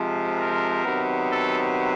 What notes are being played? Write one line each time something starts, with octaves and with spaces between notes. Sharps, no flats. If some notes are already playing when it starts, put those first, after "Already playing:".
Already playing: C3 F3 G#3
A#4
C3 D#3 F#3 B3
A4